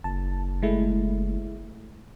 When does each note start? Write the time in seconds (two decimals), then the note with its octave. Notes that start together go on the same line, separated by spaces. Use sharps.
0.04 F#1 A5
0.62 G#3 A3 E4